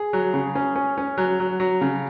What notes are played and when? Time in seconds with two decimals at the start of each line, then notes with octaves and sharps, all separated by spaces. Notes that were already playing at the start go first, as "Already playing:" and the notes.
Already playing: G#4
0.13 F#3
0.34 C#3
0.55 C#4
0.76 C#4
0.98 C#4
1.18 F#3
1.40 F#3
1.60 F#3
1.81 C#3